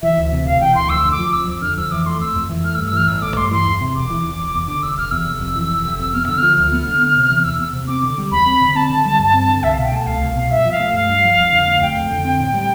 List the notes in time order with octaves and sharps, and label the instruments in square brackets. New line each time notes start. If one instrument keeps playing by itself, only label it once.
[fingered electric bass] E3 [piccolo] E5
[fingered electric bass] D2
C3
[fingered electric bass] E1 [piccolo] F5
[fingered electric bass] E3 [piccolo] G5
[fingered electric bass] D2 [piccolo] C6
[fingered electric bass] F2 [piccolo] E6
[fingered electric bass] D3
[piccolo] D6
[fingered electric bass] F3
[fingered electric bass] F2 [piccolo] E6
[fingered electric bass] F2
[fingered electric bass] D3 [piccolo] F6
[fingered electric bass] F2 [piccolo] E6
[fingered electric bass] E3 [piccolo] D6
[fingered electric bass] A3 [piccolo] C6
[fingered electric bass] F2 [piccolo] E6
[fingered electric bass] F2
E3
[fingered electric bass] A3 [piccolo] F6
[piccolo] E6
[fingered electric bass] G2
[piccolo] E6
[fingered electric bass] E3 [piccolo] F6
[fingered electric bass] A1 [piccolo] E6
[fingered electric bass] A3 [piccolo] D6
[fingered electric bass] G2 [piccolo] C6
[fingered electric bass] E3 [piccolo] C6
[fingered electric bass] E2
C3
[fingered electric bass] E1 [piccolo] D6
[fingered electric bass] E3
E2
F1
E2
D3
[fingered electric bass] F1 [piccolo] E6
[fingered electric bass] F1 [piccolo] F6
[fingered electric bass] E2 [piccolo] E6
[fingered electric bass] F1
F2
E3
F1
F1
F2
[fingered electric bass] B3 [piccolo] F6
[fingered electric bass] D3 [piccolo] E6
[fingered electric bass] F3 [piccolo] F6
[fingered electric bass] D2 [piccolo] F6
[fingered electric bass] B3
D3
B3
C3
E3
[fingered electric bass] E2 [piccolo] E6
[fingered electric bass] B3
C3
[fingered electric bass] C4 [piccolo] D6
[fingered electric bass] D3
G3
[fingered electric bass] E2 [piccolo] B5
[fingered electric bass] C4
D3
[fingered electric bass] C4 [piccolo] A5
[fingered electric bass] D3
G3
G2
C4
D3
[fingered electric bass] C2 [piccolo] E5
[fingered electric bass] B2 [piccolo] F5
[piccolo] G5
[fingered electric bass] A3 [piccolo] A5
[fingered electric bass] C2 [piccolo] F5
[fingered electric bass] C2
B2
[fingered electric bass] G2 [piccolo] E5
[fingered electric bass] F3
[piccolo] F5
[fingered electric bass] A3
[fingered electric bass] G2 [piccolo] F5
[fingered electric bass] G2
F3
F2
D3
A3
[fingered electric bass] F2 [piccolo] G5
[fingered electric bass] F2
D3
C4
A2
G3